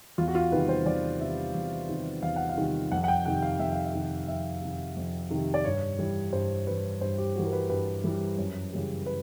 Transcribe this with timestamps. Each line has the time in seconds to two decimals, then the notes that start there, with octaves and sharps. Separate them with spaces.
0.18 E2 F4
0.28 F#4
0.35 F4
0.52 C3 D#3 G3 B4
0.69 C5
0.86 E2 D5
1.20 C3 D#3 G3 E5
1.55 E2
1.89 C3 D#3 G3
2.22 E2 F5
2.36 F#5
2.49 F5
2.58 C3 D#3 G3
2.92 F2 F#5
3.04 F#5
3.08 G5
3.25 C3 D#3 F#5
3.42 F5
3.59 F2 E5
3.73 F5
3.86 E5
3.94 C3 D#3
4.28 F2 E5
4.62 C3 D#3
4.96 F2
5.30 C3 D#3
5.54 D5
5.64 G2 C#5
5.99 E3 G3
6.33 G2 C5
6.67 E3 G3 B4
7.01 G2 C5
7.18 G4
7.35 G3 F#4
7.39 E3
7.46 A#4
7.53 B4
7.70 G2 B4
8.04 E3 G3
8.38 F#2
8.72 C#3 E3 G3
9.06 B4